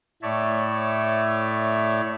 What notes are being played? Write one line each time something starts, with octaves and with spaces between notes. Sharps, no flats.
A2 A3 C#5 D5 E5